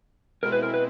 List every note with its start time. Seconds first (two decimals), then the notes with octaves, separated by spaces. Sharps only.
0.42 B2 G#3 C4 E4 A#4
0.52 B4
0.63 A#4
0.74 B4